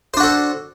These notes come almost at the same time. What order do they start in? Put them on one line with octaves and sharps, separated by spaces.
C5 D4 F#4 A4